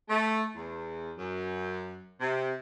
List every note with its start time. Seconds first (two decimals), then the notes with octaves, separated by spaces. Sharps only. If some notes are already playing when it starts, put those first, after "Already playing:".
0.09 A3
0.56 E2
1.17 F#2
2.21 C3